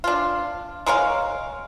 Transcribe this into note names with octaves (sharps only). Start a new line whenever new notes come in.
D4 F4
G#3 A#4 C#5 F5